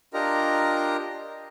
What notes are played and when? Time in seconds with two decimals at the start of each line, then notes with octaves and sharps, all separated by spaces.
0.14 D4 F4 G4 A#4 D#5 A#5